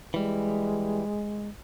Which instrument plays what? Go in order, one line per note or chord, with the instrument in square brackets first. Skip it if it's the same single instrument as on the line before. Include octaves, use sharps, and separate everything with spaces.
[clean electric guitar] E3 G3 [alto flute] G#3